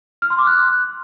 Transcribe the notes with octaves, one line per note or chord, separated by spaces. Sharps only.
F6
C6
D6
F#6